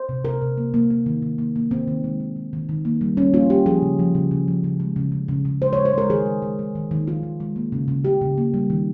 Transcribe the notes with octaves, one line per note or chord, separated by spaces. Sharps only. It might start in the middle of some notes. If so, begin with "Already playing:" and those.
Already playing: C5
C3
C3 A#4
C3
A#3
A#3
A#3
D#3
D#3
A#3
A#3
D#3 C4
D#3
G#3
D#3
G#3
D#3
D#3
A#3
G3
G3 C#4
A#3 F4
G3 G4
F3 G#4
C#3
F3
C#3
C#3
F3
C#3
G#3
C#3
C#3
C#3
C#3
G#3 C5
G#3 C#5
C5
G#3 A#4
D#3 G#4
G#3
G#3
G#3
D#3
D#3
D#3 F4
D#3
G#3
A#3
C#3
C#3
C#3 G4
C#3
A#3
G3
D#3